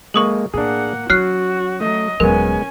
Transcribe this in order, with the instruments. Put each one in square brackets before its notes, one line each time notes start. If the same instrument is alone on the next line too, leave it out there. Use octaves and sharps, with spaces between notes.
[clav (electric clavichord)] G#3 A#3 D#5 [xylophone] C#6 D#6 F#7
[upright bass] A2 [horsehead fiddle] A#3 F#5 [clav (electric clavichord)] D4 G#4
[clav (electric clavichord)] F#3 [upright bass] C#4 [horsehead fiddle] F#4 [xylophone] F6 F#6 C7
[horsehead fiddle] F#3 D#5 [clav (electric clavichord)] A3
[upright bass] D#1 F#3 [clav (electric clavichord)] G#3 B3 [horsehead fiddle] C#4 G#5 [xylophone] A#4